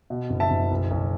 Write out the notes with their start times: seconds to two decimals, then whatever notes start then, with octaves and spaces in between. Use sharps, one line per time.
0.10 B2
0.30 F#1
0.40 E5 A5
0.50 F#1
0.71 B1
0.91 B1